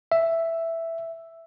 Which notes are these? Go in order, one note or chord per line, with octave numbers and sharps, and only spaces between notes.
E5